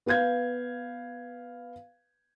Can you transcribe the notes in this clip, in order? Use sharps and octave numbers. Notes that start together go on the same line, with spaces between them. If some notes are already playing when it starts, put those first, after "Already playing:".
B3 B4 F5 G6 G#6